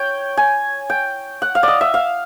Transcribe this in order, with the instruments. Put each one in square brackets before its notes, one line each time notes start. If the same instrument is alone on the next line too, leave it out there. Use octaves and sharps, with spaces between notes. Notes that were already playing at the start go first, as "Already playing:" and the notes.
Already playing: [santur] C#5 G5
G#5
G5
F#5
F5
D5 D#5
E5
F5